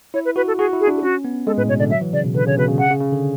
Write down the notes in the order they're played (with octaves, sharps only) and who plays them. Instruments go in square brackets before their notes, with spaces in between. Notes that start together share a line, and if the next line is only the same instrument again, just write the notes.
[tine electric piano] E4 [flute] C#5
[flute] B4
[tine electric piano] F#4 [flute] B4
[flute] A4
[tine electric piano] F#4 [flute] G#4
[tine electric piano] E4
[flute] G#4
[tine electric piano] D4
[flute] G#4
[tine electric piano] C#4 [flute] F#4
[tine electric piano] B3
[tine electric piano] G#3 [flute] A4
[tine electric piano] A2 [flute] B4
[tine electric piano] B2 [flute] C#5
[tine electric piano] D3 [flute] D5
[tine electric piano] F#3 [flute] E5
[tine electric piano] E3
[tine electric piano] C#3 [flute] D5
[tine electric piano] B2
[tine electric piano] D3 [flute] B4
[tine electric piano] C#3 [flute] C#5
[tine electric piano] B2 [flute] B4
[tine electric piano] C#3
[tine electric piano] C#3 [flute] F#5
[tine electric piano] C#3
C#3
D3